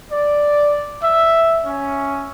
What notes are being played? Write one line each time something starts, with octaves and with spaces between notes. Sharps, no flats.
D5
E5
C#4